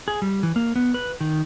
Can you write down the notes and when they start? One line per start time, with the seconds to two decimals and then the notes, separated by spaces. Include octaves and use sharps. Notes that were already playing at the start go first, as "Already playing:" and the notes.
0.08 G#4
0.22 G3
0.43 E3
0.56 A#3
0.76 B3
0.94 B4
1.21 D#3